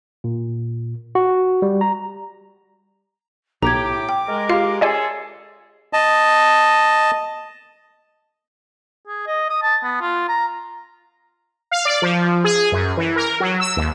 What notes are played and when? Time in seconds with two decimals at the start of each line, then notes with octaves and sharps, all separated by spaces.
0.24 A#2
1.15 F#4
1.62 G3
1.81 A#5
3.63 B1 A2 G4 A#5 D6 G#6
4.09 G5
4.28 G#3 A#4
4.49 F4 G4 F5
4.81 C#4 F4 G#4 A4 D5 D#5 G#5
5.93 D#5 A5
9.07 G#4
9.27 D#5
9.50 D#6
9.63 A5
9.83 B3
10.01 F4
10.29 A#5
11.71 F5
11.85 D5
12.02 F3
12.44 G#4
12.72 F#2
12.97 E3
13.16 A#4
13.40 F#3
13.60 E6
13.77 D#2